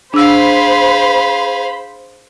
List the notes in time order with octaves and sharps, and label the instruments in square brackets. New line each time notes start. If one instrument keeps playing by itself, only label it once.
[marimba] D4 E6 [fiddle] G#4 F5 [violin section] C5 B5